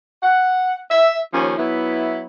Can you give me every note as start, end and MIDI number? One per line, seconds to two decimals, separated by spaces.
0.21 0.78 78
0.90 1.17 76
1.32 1.53 39
1.32 1.53 53
1.32 1.53 61
1.58 2.26 54
1.58 2.26 59
1.58 2.26 64